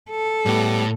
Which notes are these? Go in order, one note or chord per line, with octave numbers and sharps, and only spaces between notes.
A4
A2 G3 B3 G4